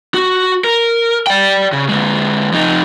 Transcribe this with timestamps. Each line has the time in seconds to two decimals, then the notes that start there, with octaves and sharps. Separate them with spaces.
0.14 F#4
0.64 A#4
1.27 D5 G5
1.72 C#3
1.89 D3 G#3
2.52 F2 D#4